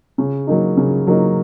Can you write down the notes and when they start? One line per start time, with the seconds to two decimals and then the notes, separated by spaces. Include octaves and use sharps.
0.18 C#3
0.47 F#3 A#3 D#4
0.77 C#3
1.07 F#3 A#3 D#4